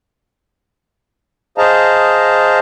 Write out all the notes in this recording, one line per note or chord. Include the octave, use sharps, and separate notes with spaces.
G#4 C5 D#5 F5 A5 A#5